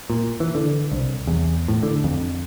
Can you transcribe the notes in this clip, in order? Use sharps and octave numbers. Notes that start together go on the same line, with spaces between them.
A#2
E3
D3
C2
E2
A2
D3
F2